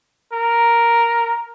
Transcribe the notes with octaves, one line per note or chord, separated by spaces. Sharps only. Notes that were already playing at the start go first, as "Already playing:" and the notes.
A#4